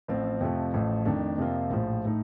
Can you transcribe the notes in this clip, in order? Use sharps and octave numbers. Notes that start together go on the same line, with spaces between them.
A1 A2 F3 C4 F4
F2 C3 F3 A3
A1 A2 F3 A3
F2 D#3 A3 D4
F2 C3 F3 A#3 F4
A#1 A2 F3
A2 A3 D#4